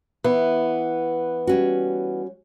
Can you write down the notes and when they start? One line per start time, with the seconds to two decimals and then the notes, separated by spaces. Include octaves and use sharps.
0.24 E3 B3
1.47 G3 C#4 F#4